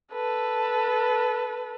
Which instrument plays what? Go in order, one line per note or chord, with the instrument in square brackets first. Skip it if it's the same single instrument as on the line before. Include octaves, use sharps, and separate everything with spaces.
[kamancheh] A4 B4